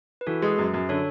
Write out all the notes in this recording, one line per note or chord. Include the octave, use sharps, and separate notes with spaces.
B4
E3 F#4 A4
G#3 G#4 B4
F#2
F#2
D3 A4 C#5